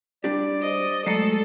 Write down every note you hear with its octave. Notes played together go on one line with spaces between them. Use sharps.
G3 D4 G4 D5
C5 D#5
F#3 G#3 A3 A4 D5 D#5